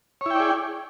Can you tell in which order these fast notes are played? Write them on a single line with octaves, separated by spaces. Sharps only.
C#5 E4 G5 D5 G#4